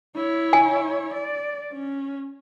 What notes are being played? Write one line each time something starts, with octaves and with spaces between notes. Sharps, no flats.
E4 C#5
G#5
D5
C#4